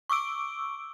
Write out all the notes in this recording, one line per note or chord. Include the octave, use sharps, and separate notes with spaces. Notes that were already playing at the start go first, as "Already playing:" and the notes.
C#6 D6 E6 D7